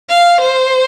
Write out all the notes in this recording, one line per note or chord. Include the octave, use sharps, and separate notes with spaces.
F5
C5